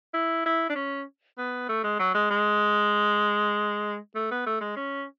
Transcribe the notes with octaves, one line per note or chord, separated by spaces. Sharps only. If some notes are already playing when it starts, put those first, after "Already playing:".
E4
E4
D4
C#4
B3
A3
G#3
F#3
G#3
G#3
A3
B3
A3
G#3
C#4